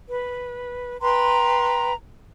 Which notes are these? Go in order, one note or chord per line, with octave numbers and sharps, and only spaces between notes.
B4
B4 G5 A#5 C6